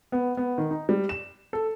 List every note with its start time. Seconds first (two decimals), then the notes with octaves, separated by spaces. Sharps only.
0.12 B3
0.37 B3
0.58 D#3
0.71 D#4
0.89 G3
1.09 E7
1.53 A4